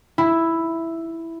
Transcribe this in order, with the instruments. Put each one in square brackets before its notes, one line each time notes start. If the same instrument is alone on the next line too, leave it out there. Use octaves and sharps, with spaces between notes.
[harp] E4